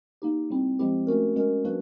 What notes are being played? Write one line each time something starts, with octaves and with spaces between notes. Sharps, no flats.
A#3 D#4 G4
G3 C4 E4
F3 G#3 C4 E4 G4
A3 C#4 F#4 A#4
G#3 C#4 F#4 A#4
F#3 A#3 D4 F#4 B4